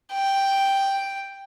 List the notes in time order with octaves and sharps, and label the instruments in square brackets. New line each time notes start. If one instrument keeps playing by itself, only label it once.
[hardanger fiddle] G5